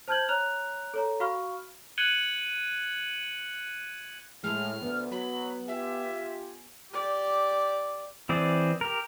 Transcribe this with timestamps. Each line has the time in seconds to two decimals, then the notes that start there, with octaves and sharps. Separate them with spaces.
0.08 C5 A5 F6 G6 G#6 F#7
0.29 C#5 A#5 F6 F#6 F7
0.94 A4 C#5 A#5
1.20 F#4 F5 B5 C#6 F6
1.98 F#6 G#6 C#7 D#7 F#7 G7
4.43 A2 G#3 A3 F6
4.81 D2 B3
5.11 F#3 B5
5.68 F4 G4 E5 G#5
6.91 G4 D5
8.29 E3 C4 G#4 D5
8.81 G4 A#4